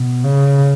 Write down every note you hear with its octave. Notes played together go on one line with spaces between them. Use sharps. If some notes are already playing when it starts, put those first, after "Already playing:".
Already playing: B2
C#3